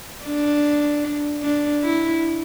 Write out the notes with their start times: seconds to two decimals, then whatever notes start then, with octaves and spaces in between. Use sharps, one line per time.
0.25 D4
1.43 D4
1.82 E4